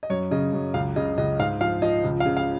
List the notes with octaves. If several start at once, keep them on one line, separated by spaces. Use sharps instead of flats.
D#5
F#2 C#5
C#3 D#5
F#2
C#2 F5
C#3 D#5
C#2 D#5
G#2 F5
F3 F5
F3 D#5
C#2
F5
C#3
F5